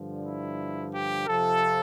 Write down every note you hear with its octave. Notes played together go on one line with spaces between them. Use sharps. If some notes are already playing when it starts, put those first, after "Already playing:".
Already playing: G2 D3 F3
E4
G4
F2 C3 F3 A4